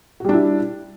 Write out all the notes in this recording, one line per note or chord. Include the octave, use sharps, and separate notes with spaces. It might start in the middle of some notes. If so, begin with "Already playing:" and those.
G3 D4 E4 F#4